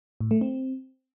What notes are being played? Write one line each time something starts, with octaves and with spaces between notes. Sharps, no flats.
A2
A3
C4